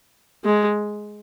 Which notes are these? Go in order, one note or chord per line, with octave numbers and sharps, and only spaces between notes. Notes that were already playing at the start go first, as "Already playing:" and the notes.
G#3